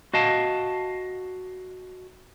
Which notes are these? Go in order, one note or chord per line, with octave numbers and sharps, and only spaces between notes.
F#4 D#5 F5 A5